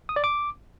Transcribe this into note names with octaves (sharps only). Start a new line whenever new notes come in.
D#6
D5
D6